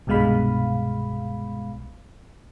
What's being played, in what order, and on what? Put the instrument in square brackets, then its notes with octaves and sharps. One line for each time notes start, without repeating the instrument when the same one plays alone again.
[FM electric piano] C2 G2 B2 G#3 F5 B5